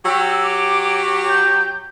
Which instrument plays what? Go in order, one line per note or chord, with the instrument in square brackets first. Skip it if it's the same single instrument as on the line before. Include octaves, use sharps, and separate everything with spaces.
[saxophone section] F#3 G4 [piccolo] E6
[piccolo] D6
G6